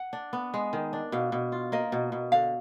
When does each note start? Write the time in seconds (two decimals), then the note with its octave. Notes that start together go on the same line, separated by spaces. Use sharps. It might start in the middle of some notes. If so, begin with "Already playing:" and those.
Already playing: F#5
0.13 D4
0.33 B3
0.54 G#3
0.73 D#3
0.93 D4
1.12 B2 F5
1.32 B2
1.52 F4
1.72 A#3 D#5
1.92 B2
2.12 B2
2.32 D3 F5